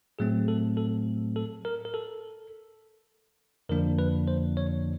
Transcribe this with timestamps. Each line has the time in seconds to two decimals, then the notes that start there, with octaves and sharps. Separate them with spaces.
0.19 A2 F#3 A3 C4 G#4
0.48 A4
0.77 A4
1.36 A4
1.65 A#4
1.85 A#4
1.94 A4
3.69 F2 D3 F3 A#3 D4 A#4
3.99 B4
4.28 C5
4.57 C#5